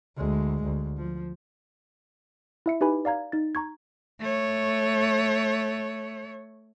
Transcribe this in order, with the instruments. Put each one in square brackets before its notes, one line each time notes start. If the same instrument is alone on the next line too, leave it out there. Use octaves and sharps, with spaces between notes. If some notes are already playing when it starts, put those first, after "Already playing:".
[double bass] D2 G#3
D2
F3
[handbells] E4 E5 C#7
D#4 G4 B4 G#5 B5
D5 F5 A#5 G#6
D#4 A6
A#5 C#6 G#6
[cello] A3 C#5